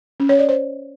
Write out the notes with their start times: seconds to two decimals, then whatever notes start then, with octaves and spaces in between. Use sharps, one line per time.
0.20 C#4
0.29 C#5
0.39 D5
0.49 C5